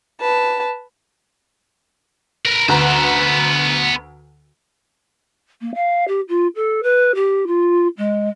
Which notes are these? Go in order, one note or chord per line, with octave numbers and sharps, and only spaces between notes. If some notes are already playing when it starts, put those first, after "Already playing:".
B4 A5
A#4 B4
D2 B3 B4 C5 A#5
A#3
F5
G4
F4
A4
B4
G4
F4
G#3